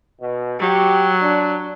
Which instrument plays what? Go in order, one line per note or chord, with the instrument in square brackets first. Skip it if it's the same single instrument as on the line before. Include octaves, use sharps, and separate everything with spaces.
[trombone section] B2
[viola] F#3 [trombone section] G4
[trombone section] D4